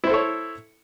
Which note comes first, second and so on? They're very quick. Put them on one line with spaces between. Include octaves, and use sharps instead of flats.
E4 C5 A4 C#5